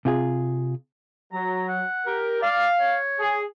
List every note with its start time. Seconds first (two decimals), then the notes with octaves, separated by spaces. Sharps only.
0.05 C3 F4 G#4
1.32 F#3 A#5
1.68 F#5
2.05 G4 A#4
2.42 D5 F5
2.80 C#5
3.19 G#4